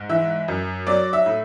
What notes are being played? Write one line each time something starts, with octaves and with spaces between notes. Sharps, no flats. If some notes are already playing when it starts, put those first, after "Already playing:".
Already playing: G#2
E3 E5
F#2
F#3 D5
E5
A2